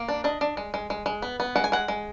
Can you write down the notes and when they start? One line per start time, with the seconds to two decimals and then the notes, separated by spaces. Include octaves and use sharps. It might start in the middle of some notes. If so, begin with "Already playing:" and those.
Already playing: A#3
0.09 D4
0.24 D4 D#5
0.41 D4
0.57 G#3
0.74 G#3
0.90 G#3
1.06 G#3
1.22 B3
1.40 B3
1.56 G#3 F#5
1.64 G#5
1.72 G#3 F#5
1.88 G#3